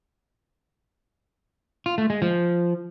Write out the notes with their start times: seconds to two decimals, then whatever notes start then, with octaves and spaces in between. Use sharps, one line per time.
1.86 F4
1.98 A3
2.10 G#3
2.22 F3